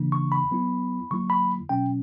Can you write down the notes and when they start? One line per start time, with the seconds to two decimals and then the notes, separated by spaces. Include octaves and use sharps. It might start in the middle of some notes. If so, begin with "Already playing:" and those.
Already playing: C#3 E3 A#3 D4
0.12 C#6
0.32 B5
0.51 F#3 B3 E4
1.11 D3 F#3 A#3 E4 C#6
1.30 B5
1.69 B2 F#3 C#4 G5